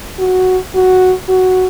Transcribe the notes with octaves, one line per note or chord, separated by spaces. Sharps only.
F#4
F#4
F#4